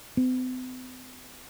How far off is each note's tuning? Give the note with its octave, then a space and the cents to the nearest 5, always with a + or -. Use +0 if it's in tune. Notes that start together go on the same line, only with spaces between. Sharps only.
C4 -45